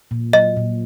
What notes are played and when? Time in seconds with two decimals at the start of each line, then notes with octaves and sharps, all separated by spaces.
0.11 A#2
0.33 F#3 D#5
0.57 A#2